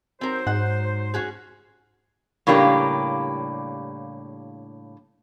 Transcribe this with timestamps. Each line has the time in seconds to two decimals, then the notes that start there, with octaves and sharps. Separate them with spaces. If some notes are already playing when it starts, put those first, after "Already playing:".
0.21 F#3 C4 D#4 A#4 C5
0.47 G#2 F#5
1.14 C#4 F#4 G#4
2.47 A2 C#3 G3 A#3 D4 G4